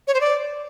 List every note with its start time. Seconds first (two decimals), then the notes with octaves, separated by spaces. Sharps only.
0.08 C#5
0.14 C5
0.21 D5